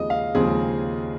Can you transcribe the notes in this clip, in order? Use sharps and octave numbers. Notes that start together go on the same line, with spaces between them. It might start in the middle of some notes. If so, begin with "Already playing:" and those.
Already playing: D#2 C#3 F3 G#3 C4 D#5
F5
D#2 C#3 F3 G#3 C4 G#4